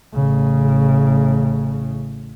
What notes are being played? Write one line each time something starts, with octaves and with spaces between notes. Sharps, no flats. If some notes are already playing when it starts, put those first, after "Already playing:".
A1 C#3